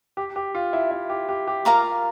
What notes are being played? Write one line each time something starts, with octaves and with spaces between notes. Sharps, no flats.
G4
G4
F4
E4
E4
G4
G4
G4
F4 A#4 F5 A#5 D6